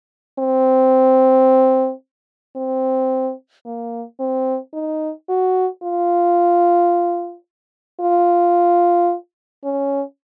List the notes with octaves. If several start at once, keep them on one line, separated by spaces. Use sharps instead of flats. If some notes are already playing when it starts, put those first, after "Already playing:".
C4
C4
A#3
C4
D#4
F#4
F4
F4
C#4